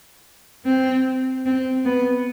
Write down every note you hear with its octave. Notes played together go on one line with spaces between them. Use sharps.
C4
C4
B3